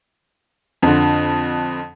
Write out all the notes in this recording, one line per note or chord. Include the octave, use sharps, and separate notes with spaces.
F2 D3